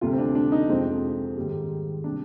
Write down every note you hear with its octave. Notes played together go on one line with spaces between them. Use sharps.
D2 C3 G3 F4
C4
D4
D4
D#4
F2 C3 F3 G#3 C4
G#2 D#3 G3
C3 G3 D4